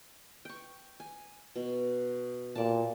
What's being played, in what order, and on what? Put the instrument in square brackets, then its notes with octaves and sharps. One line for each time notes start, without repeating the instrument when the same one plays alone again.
[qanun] G5 C#6
G#5
B2
[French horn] A#2 [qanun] D5 A5